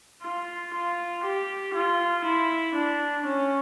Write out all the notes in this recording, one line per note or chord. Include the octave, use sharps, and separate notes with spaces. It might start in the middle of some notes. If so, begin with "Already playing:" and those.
F4
F4
G4
F4
E4
D4
C#4